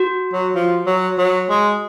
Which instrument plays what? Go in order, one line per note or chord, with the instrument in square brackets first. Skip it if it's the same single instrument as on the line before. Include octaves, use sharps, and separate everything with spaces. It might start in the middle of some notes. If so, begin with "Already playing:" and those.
Already playing: [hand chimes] F#4
[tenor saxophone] F#3
F3
F#3
F#3
G#3